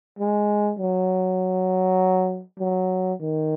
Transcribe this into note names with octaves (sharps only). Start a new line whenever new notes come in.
G#3
F#3
F#3
D#3